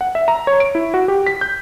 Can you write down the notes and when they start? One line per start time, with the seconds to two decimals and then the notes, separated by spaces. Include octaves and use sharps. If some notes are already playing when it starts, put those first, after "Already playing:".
0.01 F#5
0.15 E5
0.28 A#5
0.47 C#5
0.60 D7
0.75 E4
0.94 F#4
1.08 G4
1.26 B6
1.41 G6